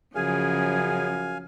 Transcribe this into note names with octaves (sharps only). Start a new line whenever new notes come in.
F#2 C#3 F3 G#4 F5 G#5